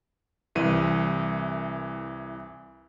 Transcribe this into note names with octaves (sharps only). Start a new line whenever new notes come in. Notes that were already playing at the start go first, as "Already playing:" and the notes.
C2 E3 D#7